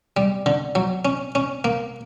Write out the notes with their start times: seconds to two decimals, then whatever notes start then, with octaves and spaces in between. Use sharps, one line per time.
0.17 G3
0.46 D3
0.75 F#3
1.05 C#4
1.35 C#4
1.64 A#3